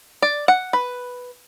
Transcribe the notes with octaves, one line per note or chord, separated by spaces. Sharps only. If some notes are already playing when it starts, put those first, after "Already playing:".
D5
F#5
B4